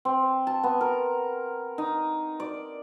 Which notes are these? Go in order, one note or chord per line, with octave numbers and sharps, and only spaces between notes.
C4
A5
B3
A#4
D#4
D5